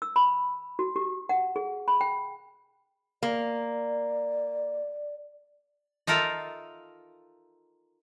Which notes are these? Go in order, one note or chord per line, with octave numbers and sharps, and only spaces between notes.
E6
B5
F#4
G4
F#5
G#4
B5
G5
A#3 D5
D#4 F4 A4 A#4 E5 F5